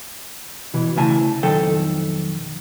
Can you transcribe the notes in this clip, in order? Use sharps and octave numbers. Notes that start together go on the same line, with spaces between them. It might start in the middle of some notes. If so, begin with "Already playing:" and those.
B2 E3
C#3 A3 E4 G#5 A5
B1 F2 D#3 A4 G5